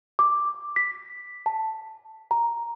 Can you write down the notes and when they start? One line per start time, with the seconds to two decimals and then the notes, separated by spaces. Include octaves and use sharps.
0.19 D6
0.76 B6
1.46 A5
2.31 A#5